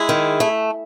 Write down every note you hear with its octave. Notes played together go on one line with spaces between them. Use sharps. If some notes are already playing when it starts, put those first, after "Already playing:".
Already playing: G#3 E4 G#4
D#3
A3